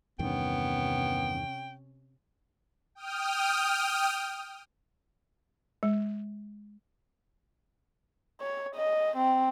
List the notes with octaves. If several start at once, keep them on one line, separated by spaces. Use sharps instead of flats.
E2 G2 C3 D#3 B3 C#4 G5
G5 D#6 F6
G#3
C#5
D#5
C4